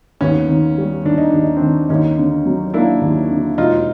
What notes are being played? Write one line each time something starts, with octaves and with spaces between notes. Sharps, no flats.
D#2 B3 C#4
D#3
G3
D#2 D4
D#4
D#2 D4
D#4
C4 D4
D#3
D#2 C#4 D#4
D3
F#3
A#3 D4 E4
D#2
D3
E1 D#4 F4